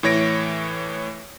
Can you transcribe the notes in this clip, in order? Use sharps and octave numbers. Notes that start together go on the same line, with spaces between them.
A2 E3 C#5 A#6 D7